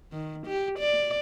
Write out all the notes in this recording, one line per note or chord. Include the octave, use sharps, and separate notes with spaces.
D#3
G4
D5